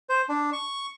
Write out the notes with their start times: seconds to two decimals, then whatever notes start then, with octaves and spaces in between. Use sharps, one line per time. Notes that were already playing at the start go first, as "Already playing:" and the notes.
0.09 C5
0.29 D4
0.53 C#6